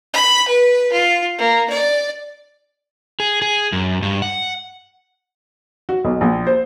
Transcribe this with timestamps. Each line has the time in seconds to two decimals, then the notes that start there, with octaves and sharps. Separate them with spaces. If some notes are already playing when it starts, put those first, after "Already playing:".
0.14 B5
0.48 B4
0.92 F4
1.38 A#3
1.70 D5
3.20 G#4
3.42 G#4
3.72 F#2
4.02 G2
4.22 F#5
5.89 F#4
6.05 B1
6.21 A#1
6.47 C5